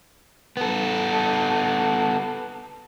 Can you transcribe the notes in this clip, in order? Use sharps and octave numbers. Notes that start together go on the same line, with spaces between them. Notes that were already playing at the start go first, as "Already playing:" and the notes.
B3 A4